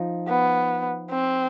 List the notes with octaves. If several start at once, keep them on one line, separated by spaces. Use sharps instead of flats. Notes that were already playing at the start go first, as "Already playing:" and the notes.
Already playing: F3 D#4
B3
C4